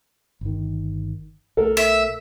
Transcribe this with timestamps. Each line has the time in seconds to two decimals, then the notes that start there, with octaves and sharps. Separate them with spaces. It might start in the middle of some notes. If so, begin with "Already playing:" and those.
0.41 G1 D#3
1.57 B1 A3 A4 A#4
1.77 E5